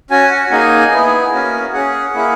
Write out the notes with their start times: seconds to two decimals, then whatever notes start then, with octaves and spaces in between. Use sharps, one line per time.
0.10 C#4 F#4 G#5
0.31 F#5
0.51 A#3 D#4 G#4 G#5
0.91 B3 E4 G#4
1.33 A#3 C#4 F#4
1.73 C#4 G#4 F#5
2.14 A#3 E4 G#4